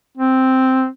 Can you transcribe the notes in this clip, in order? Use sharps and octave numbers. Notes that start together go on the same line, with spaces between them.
C4